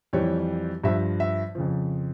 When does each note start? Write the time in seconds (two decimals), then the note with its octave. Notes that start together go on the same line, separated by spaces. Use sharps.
0.13 F2 E3 G3 C#5
0.84 G2 F3 E5
1.20 E5
1.55 F2 C#3 F3